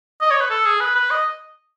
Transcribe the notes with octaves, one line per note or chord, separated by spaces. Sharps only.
D#5
C#5
B4
A4
G#4
B4
B4
D#5